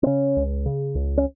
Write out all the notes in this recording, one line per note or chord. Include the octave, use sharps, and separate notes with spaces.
C4
C#3 C#4
C#2
C#3
C#2
C#4